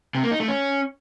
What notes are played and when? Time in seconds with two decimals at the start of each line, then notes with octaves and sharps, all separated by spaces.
0.15 C3
0.23 A#3
0.31 D#4
0.40 A3
0.48 C#4